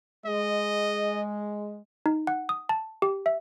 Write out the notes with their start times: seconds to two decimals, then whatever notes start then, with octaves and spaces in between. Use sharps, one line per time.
0.26 G#3 D#5
2.06 D#4
2.27 F#5
2.49 D#6
2.69 A5
3.02 G4
3.26 E5